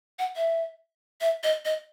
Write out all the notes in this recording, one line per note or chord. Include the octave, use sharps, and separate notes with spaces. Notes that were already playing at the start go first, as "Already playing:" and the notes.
F#5
E5
E5
D#5
D#5